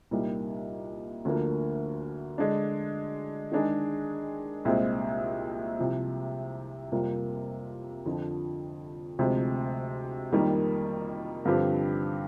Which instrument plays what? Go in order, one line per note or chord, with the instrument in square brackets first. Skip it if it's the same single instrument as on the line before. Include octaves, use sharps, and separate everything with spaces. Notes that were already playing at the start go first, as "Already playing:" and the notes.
[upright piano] C2 A#2 G3 A#3 D#4
D2 D3 F3 A#3
D3 G#3 D4
D#3 G#3 D4 G#4
C2 A#2 G#3 C4
C2 C3 F3
F2 C3 G3 A#3 F4
F2 D3 F3
D2 C3 F3 G#3 C4
F2 D#3 G3 A#3
G2 D3 F3 C4 G4